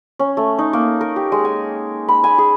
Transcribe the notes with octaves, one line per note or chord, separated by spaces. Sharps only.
C#4
A3
D#4
A#3
A#4
G4
G#3
G#5
B5
G#5
G#4